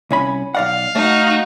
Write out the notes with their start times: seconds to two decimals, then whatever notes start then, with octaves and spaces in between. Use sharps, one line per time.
0.11 C2 C#4 B5
0.55 B1 D5 F5 F#5
0.95 A3 D#4 F#4